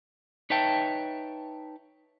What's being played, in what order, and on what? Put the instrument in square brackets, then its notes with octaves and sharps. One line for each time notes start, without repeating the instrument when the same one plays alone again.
[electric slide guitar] D#4 B4 C#5 E5 G5 A5